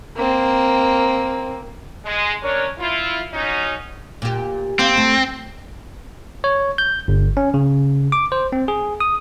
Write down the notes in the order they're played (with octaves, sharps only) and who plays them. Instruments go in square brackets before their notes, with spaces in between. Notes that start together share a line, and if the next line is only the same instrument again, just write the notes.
[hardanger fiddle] A#3 C4
[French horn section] G#3
C#4 D4 A#4 C#5
E4 F4
F#3 C#4 D#4
[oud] A#2 G4
[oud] A#3 F5 [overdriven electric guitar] C4
[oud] A3 A4
[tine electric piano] C#5
G6
G1
C#4
C#3
D6
C5
C4
G#4
D#6